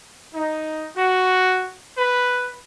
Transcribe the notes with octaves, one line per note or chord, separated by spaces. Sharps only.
D#4
F#4
B4